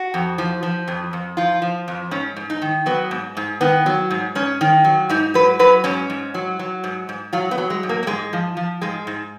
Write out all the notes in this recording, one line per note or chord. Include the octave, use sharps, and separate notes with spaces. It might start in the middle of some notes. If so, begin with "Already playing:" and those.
Already playing: F#4
F2
F3
F3
F2
F2
F3 F4
F3
F2
G#2 C#4
G#2
D#4
D#3
F#3 B3
G#2
G#2
D#3 B3
F#3
G#2
G#2 C#4
D#3
F#3
G#2 D#4
F#3 B4
F#3 B4
G#2 C#4
G#2
F#3
F#3
G#2
G#2
F#3 F4
B3
F#3
G#3
G#2
A#3
A#3
G#2 G#3
F3
F3
G#2 G#3
G#2